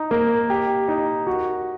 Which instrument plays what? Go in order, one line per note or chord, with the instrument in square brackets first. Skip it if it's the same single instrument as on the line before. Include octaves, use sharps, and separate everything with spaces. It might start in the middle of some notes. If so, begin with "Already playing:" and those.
Already playing: [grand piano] D#4
A#3
G4
D#4
F#4